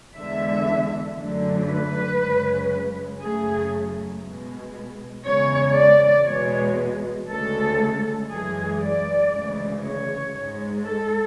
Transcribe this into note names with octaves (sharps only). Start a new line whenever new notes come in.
E2 D3 G#3 E5
F#2 D3 F#3 A3
B4
F#2 C#3 G#3
F#2 C#3 F#3 A3 G#4
B2 G#3
E2 C#3 G#3 C#5
D5
E2 B2 G#3 C#5
D2 C#3 G#3 A4
F#2 E3 G#3 G#4
D5
D2 C#3 E3 G#3
C#5
G#2 G#3
A4